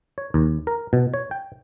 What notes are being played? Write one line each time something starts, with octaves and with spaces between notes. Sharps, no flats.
C#5
D#2
A#4
B2
C#5
G5